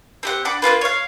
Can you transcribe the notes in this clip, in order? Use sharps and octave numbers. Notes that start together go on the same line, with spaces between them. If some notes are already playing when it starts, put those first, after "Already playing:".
C4 G4 F#5
D4 F#5 B5 D6
A#3 C#4 F4 B4
C#5 F5